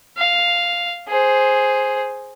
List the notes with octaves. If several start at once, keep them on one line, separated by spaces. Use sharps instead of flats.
F5
G#4 C5